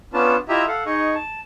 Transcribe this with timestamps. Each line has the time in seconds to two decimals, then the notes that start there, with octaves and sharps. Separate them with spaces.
0.14 B3 C#4 D4 F4 B4 A5
0.49 E4 F4 G4 D#5 E5 A#5
0.67 A4 F5 F#5
0.86 D#4 G#4 D#5 C#6
1.15 A5